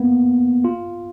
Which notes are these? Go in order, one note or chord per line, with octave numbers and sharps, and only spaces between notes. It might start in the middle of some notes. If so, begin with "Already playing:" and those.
Already playing: A#3 B3
F4